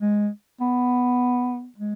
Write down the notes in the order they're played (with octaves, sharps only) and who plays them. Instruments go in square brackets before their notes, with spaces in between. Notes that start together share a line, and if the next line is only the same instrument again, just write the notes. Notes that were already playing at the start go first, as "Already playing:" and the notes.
[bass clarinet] G#3
B3
G#3